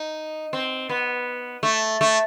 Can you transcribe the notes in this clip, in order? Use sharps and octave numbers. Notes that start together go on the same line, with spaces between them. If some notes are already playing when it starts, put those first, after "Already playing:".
Already playing: D#4
C4
B3
A3
A3